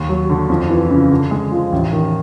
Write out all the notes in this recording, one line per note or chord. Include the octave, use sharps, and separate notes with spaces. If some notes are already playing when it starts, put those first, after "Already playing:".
Already playing: D#2
F#3
D3
F2
E3
C#3
D3
G#3
F3
A1
D#3